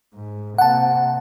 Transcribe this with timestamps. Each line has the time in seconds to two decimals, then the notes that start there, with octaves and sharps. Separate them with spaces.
0.15 G#2
0.58 C3 A#3 F#5 A5